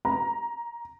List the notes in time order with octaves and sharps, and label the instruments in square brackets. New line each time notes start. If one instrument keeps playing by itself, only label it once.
[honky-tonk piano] A#5